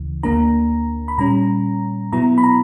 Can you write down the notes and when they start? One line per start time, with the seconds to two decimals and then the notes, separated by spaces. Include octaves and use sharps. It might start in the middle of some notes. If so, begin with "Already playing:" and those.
Already playing: D2 C#3 E3
0.23 D2 D3 A#3 D4 A#5
1.08 B5
1.18 A#2 G3 C#4 A#5
2.12 B2 F#3 B3 E4 A#5
2.38 B5
2.43 A#5